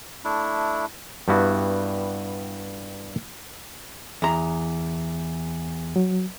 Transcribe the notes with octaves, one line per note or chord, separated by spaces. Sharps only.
A3 D4 E4
G2 G3 B3 E4 F#4
E2 A#5
F#3